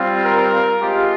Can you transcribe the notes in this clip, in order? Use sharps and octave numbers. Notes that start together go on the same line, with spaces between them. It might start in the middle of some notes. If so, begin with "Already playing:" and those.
Already playing: G3 C4 F4
A#4
G#3 C4 F4 G4